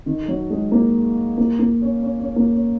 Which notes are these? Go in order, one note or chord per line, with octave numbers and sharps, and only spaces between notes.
D#3
F#3
G#3
A#3
A#3
A#3
C#4
C#4
C#4
A#3
C#4